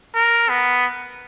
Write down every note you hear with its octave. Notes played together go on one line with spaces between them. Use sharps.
A#4
B3